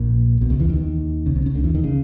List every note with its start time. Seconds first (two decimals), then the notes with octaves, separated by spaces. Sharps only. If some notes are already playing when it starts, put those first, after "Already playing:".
Already playing: A#1 A#2
0.41 B1 B2
0.50 C#2 C#3
0.60 E2 E3
0.69 D#2 D#3
1.26 C#2 C#3
1.36 C2 C3
1.46 C#2 C#3
1.55 D2 D3
1.64 E2 E3
1.74 D#2 D#3
1.84 C#3